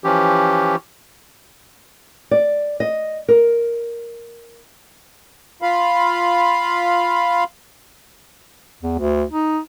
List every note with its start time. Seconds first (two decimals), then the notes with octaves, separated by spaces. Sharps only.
0.04 E3 F3 C#4 G4
2.31 D5
2.80 D#5
3.28 A#4
5.62 F4 F5 B5
8.83 E2
8.99 D2
9.30 D#4